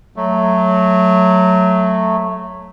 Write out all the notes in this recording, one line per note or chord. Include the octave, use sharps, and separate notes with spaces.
F#3 A3